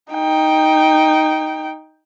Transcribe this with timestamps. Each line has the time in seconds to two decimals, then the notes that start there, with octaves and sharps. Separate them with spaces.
0.13 D#4 G5